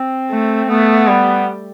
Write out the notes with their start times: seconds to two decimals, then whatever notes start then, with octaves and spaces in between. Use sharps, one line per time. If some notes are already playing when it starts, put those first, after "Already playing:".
Already playing: C4
0.31 A3
0.69 A3 B3
1.07 G3